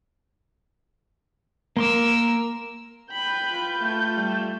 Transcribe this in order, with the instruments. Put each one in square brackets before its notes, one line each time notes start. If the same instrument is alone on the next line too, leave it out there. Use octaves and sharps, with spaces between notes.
[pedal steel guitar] A#3 C6 D6 [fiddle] A#4 E6
[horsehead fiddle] B4 G5 [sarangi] B5 [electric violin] G6
[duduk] F4
[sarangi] A3
[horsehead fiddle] G3